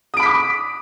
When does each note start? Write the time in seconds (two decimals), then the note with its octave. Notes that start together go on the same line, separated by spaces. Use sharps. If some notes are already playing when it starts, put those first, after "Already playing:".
0.14 D#6
0.17 D7
0.20 B5
0.23 B6
0.26 D6